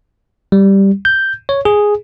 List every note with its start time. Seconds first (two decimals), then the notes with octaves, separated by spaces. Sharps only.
0.52 G3
1.05 G6
1.49 C#5
1.65 G#4